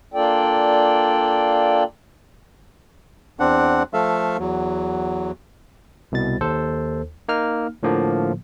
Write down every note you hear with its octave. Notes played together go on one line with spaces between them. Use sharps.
A#3 D4 F4 A4 D5 G5
E2 C4 D4 F#5
F3 A3 A4 E5 F5
E2 F#3
C2 B2 A6
D#2 A4 C5
A#3 D#4 F6
A2 D3 F3 A#3